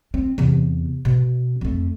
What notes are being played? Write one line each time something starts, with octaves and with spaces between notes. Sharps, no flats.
C4
E2 C3
B2
F2 A3